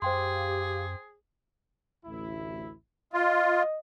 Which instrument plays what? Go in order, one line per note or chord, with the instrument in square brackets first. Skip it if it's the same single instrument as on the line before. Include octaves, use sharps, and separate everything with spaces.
[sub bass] F#2 [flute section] G4 F5 [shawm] G#4 [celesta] C5 G5 C6
[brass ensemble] A1 D2 E4
[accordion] F4 [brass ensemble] D#5